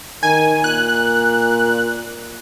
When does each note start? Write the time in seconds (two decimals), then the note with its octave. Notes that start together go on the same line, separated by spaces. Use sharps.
0.23 D#3 G#5
0.64 A#2 F#6